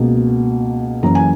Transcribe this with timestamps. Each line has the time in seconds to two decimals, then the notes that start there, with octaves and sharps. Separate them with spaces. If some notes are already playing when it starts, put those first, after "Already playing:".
Already playing: C#2 B2 A#3
1.03 F#1 F#2 E3 A#5
1.15 G#5